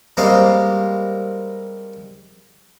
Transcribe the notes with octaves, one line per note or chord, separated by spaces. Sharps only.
G3 G#3 A#3 C4 F5